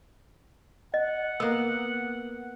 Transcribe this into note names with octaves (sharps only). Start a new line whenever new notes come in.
D#5 F#5
A#3 B3 E6